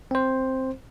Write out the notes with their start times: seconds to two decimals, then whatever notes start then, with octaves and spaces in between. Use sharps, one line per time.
0.11 C4 C5